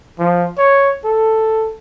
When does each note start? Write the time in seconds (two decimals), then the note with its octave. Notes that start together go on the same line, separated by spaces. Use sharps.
0.19 F3
0.58 C#5
1.05 A4